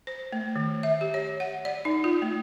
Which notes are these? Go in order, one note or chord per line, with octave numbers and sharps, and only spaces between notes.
C5
A3
D#3
E5
G4
C#5
F#5
D5
D#4
F4
A3